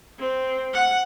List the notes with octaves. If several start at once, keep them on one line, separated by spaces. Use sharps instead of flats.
C4
F#5